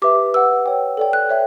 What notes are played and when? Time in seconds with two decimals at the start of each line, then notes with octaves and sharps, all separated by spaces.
0.02 G4 B4 E5 D6
0.34 B4 F#5 E6
0.66 C#5 G5
0.97 A4 D5 G5
1.13 F#6
1.29 C#5 E5 G5